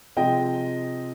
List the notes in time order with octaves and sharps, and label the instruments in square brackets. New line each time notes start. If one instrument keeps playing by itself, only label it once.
[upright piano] C3 F3 G#3 D#5 G5